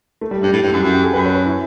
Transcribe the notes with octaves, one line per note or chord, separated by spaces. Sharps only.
A3
G3
G2 G3
A2
G2
F#2 E4
F#2 F#4
G4
A4
F#2 B4
C#5
B4
E4